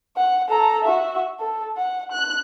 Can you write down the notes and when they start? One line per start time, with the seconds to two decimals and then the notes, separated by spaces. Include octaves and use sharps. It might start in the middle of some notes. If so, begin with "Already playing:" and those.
0.16 F#5
0.49 A4 A#5
0.84 F#4 E5
1.40 A4
1.77 F#5
2.11 F#6